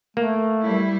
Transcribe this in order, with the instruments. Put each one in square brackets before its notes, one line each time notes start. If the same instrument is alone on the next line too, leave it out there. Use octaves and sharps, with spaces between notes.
[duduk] A3 [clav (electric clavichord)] A#3
[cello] G3 E4